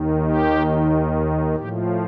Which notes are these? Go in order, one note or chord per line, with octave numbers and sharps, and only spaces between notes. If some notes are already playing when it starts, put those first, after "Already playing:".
Already playing: D#2 D#3
G4
A2 F3 G4